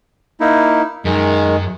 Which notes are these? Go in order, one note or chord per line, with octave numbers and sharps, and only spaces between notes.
A#3 D#4 E4
F#2 D#3 G#3